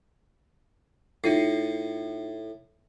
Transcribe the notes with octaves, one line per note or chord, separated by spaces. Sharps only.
A2 D#4 F4 C7